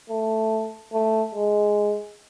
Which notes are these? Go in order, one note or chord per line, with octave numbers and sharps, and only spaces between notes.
A3
A3
G#3